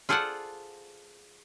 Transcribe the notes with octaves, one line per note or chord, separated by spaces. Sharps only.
F4 G#4 A4 C5 D5 F#5